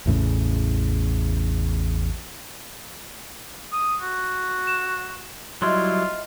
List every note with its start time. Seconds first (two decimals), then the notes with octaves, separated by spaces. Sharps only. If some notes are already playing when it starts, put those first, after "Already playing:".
0.06 A1 E2 A2 C#3
3.73 D#6
4.01 F#4
4.67 E7
5.62 F#3 G3 E4 F4 D#5 E5 C6